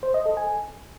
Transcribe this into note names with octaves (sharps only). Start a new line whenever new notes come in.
C5
D#5
A4
G#5